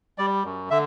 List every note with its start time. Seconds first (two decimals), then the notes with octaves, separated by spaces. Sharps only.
0.18 G3 D5
0.45 F#2
0.70 D3 E5